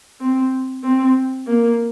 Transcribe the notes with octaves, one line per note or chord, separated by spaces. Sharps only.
C4
C4
A#3